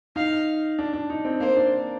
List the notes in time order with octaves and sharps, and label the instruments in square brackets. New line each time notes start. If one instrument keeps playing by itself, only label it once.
[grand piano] D#4 [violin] F5
[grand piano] D4
D4
D#4
C4
[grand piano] A#3 [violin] C5
[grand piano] D4